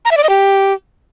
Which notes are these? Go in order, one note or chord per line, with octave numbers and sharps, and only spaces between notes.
A#5
E5
D5
D#5
G4